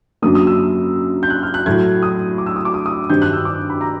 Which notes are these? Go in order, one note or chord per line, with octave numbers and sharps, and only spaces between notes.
F#2 D3 F#3 A#3 D#6
D#6
E6
G6
F#6
F6
F#6
A2 F#3 A3 G#6
D#6
D6
E6
D#6
D6
D#6
D#6
G2 D#3 G3 C4 G6
F#6
E6
D6
B5
A#5